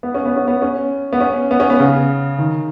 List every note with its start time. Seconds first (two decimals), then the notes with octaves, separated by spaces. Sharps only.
0.03 B3
0.14 C#4
0.26 B3
0.36 C#4
0.48 B3
0.62 C#4
1.13 B3
1.20 C#4
1.51 B3
1.60 C#4
1.70 B3
1.80 C#3
2.38 D#3